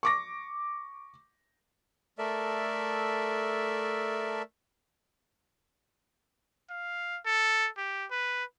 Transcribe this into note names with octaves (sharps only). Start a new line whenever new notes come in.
C#6 D6 A#6
A3 A4 A#4 D5 E5
F5
A4
G4
B4